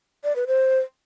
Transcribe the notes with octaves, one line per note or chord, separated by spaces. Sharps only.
D5
B4
C5